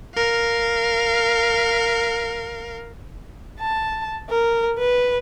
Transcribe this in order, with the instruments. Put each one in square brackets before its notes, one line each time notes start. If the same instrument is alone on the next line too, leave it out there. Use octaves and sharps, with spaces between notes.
[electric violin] A#4 F5
[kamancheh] A5
A#4
B4